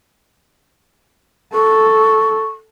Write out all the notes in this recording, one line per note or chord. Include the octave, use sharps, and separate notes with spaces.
A4 C#6